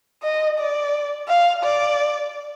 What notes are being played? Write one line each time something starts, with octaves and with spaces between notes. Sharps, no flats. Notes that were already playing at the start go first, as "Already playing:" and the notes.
D#5
D5
F5
D5